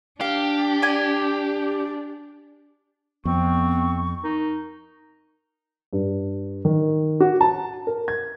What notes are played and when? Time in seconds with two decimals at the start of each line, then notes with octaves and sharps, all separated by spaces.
0.21 D4 G4 F5
0.82 D5 G#5
3.25 F2 B3 C4 C#6
4.23 D#4 A#4
5.93 G2
6.65 D#3
7.20 F#4
7.41 A5
7.87 A#4
8.08 G#6